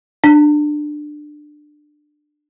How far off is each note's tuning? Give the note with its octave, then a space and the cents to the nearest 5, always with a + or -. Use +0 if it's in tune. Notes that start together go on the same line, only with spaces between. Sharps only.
D4 +20